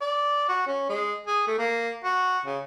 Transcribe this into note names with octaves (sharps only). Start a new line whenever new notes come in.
D5
F#4
C#4
G#3
G#4
A3
A#3
F#4
C#3